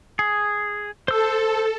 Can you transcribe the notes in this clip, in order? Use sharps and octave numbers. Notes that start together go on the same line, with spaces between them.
G#4
A4 C5 E6